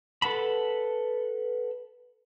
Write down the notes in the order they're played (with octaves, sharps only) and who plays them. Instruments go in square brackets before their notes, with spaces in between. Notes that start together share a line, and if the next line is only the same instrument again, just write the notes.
[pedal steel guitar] A4 B4 F#5 A5 B5